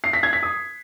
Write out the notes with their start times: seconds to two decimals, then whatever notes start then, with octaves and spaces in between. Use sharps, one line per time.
0.04 C7
0.13 B6
0.23 G#6
0.33 B6
0.43 D#6